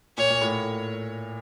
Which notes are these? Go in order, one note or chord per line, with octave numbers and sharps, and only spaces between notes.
A#2 C#5
A#2
A2